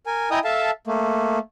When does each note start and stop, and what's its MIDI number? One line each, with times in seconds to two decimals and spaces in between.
0.07 0.30 70
0.07 0.30 80
0.31 0.39 64
0.31 0.39 75
0.31 0.39 79
0.31 0.39 80
0.31 0.39 82
0.31 0.39 87
0.44 0.71 69
0.44 0.71 76
0.44 0.71 77
0.44 0.71 81
0.87 1.39 57
0.87 1.39 58